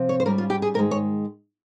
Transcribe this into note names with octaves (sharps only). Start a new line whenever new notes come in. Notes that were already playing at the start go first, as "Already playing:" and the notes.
Already playing: C3 F3 C4
C#5
C5
G#2 G3 C#4 A#4
F4
G4
G#4
G#2 D#3 G#3 A#4
C#5